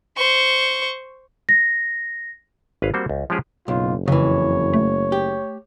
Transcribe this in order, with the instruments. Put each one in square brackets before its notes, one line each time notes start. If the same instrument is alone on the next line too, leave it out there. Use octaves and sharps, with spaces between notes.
[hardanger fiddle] C5 C#6
[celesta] A#6
[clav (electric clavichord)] G#1 B4 C#5 F5
G3 A#3 C4 F#4 C5
C#2
F3 G#3 C#4 G4 G#4
[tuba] F#1 [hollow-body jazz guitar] B1 [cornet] F4
[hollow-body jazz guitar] F2 E3 [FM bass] C#3 [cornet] C#5
[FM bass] A3
[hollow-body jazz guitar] G4